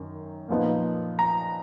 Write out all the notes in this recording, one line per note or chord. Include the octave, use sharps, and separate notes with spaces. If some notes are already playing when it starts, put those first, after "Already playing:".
Already playing: F#2 D#3
A#2 F3 B3 D#4
A#5